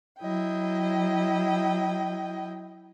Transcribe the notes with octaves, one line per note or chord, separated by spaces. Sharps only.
F#3 E4 D#5 G5